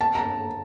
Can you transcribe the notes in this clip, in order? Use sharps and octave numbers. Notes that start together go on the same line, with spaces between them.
A5
A#5